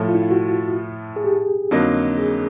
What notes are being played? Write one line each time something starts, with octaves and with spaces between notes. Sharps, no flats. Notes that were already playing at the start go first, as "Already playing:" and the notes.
Already playing: A2 F3 A3
F4
E4
F4
F#4
G#4
G4
F2 D3 F#3 A#3 D#4
G#4